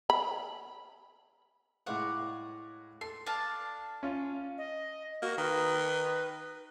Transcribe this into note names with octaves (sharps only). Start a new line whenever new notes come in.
B5
A2 G#3 C#5 D5 F5 F#5
A4 C6
D4 F5 A5
C#4 F4
D#5
A#3 F#4
D#3 B4